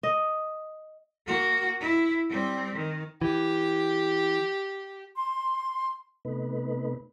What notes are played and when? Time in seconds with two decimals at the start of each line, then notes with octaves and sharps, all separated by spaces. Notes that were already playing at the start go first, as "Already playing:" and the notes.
0.03 D#5
1.26 A#3 F#4
1.80 E4
2.29 G3 C4
2.75 D#3
3.22 E3 G4
5.16 C6
6.25 C3 A3 B3 D#4 B4